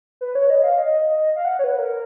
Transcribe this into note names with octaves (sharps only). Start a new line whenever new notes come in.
B4
C#5
D#5
F5
D#5
F5
F#5
C#5
B4
A#4